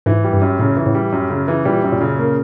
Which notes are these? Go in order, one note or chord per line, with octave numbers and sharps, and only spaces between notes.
G#2 E3
G3
G2
F#2
A2 C#3
E3
A2
G3
F#2
C#3
E3
A#2 G3
F#2
A#2
C#3
A#3